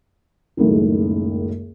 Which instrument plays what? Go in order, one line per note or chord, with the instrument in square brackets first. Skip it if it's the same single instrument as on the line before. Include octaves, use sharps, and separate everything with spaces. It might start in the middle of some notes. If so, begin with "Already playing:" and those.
[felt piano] F#1 C#2 F#2 A2 D#3